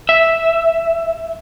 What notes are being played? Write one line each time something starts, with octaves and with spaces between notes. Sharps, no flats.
E5